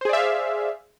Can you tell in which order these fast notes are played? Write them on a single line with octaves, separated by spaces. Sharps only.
C5 G#4 D5 E5 F5